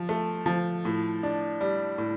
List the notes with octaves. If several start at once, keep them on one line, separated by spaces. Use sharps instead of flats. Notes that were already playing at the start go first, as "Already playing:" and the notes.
Already playing: F3
A3
F3
A2
D4
G3
A2